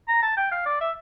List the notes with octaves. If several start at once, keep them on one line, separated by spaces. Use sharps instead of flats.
A#5
A5
G5
F5
D5
E5